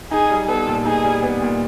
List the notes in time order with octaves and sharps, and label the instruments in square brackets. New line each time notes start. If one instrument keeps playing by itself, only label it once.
[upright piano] D#4 [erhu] G#4
[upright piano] G3
[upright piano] B3 [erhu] A4
[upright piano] A#2
[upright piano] D#4 [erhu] G#4
[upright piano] G3
B3
A#2